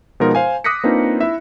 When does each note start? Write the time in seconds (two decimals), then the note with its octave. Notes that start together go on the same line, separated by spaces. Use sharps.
0.20 B2 F3 G#3 D#4 F4 A#4
0.35 C5 F5 G#5
0.64 D6 D#6 F#6 A#6 B6 C#7
0.84 A#3 C4 D4 D#4 F4 B4
1.21 E4 E5